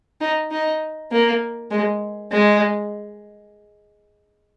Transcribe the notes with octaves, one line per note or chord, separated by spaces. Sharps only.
D#4
D#4
A#3
G#3
G#3